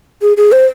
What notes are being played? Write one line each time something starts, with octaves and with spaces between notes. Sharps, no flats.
G#4
G#4
C5